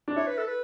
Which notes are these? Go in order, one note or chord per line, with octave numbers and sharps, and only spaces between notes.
D4
E4 C#5
B4
A4
B4